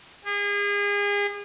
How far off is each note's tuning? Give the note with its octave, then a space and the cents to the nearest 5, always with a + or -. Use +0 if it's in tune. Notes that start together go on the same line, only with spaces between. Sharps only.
G#4 -35